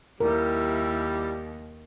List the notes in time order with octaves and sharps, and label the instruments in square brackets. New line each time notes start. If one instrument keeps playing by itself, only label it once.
[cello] D#2 [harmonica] G3 [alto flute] E4 [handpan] A#4